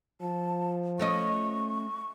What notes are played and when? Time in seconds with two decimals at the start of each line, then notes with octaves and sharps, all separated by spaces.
0.21 F3 A5
0.99 A3 C#4 D#5 C#6